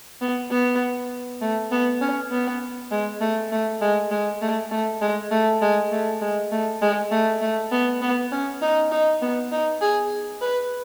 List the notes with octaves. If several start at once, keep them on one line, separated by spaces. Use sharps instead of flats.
B3
B3
A3
B3
C#4
B3
G#3
A3
A3
G#3
G#3
A3
A3
G#3
A3
G#3
A3
G#3
A3
G#3
A3
A3
B3
B3
C#4
D#4
D#4
B3
D#4
G#4
B4